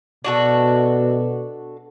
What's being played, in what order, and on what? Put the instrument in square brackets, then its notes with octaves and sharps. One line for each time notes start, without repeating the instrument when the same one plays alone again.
[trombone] B2 [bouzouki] D4 F#4 A4